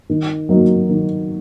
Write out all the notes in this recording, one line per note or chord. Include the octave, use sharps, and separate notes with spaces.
D#3
F#3 A#3 D#4 F#4
D#3